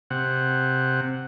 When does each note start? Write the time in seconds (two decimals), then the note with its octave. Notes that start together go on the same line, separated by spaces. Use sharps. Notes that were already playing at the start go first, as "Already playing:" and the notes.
0.10 C3 F#5